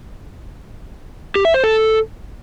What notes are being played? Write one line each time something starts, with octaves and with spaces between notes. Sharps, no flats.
G4
E5
C5
A4